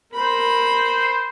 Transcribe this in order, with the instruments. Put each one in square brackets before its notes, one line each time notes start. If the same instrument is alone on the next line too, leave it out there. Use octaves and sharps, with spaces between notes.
[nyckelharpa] A#4 B5 [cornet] C5